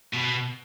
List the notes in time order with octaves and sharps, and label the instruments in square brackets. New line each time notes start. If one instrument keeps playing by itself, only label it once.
[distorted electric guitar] B2